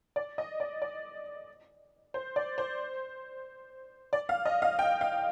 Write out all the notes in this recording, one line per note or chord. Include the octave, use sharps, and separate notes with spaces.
D5
D#5
D5
D5
C5
D5
C5
D5
F5
D#5
F5
G5
F5